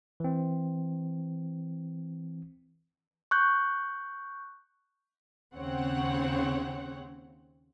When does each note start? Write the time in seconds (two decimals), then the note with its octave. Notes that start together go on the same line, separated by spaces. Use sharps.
0.20 E3 C4
3.31 C#6 F#6 G6
5.55 D#2 C#3 C4 C#5 F#5